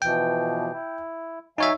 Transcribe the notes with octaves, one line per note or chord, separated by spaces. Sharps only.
B2 E3 F3 G5
E4
F#3 D#4 C#5 E5 F5 G#5